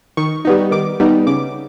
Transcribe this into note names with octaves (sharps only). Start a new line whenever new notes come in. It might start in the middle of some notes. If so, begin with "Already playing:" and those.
D#3 C#6
G3 B3 D#4
D#3 D6
G3 B3 D#4
C#3 D6